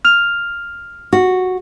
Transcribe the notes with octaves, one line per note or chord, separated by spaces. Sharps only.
F6 F7
F#4